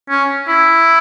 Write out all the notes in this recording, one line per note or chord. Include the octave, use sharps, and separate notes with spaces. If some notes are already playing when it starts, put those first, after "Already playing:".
C#4
E4